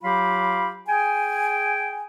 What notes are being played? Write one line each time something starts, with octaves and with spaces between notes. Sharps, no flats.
F#3 F4 G4 F5 B5
G#4 G5 G#5